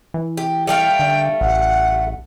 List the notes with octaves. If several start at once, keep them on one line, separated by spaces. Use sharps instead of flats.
E3
G4
G3 A3 F5 G5
D3
A1 F#5